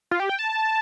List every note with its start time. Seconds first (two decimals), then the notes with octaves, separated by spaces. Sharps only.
0.11 F4
0.20 G4
0.29 G5
0.39 A5